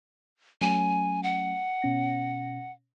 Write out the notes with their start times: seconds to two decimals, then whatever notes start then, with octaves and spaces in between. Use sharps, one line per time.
0.61 F#3 A3 C#4 G#5
1.23 F#5
1.82 B2 C#4 A#6